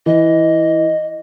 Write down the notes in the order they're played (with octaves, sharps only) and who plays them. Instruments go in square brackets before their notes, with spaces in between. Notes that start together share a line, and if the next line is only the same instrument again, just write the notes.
[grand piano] E3 [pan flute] D#5